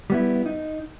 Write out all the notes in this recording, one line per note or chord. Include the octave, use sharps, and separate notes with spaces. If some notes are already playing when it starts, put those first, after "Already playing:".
G3 B3 E4
D#4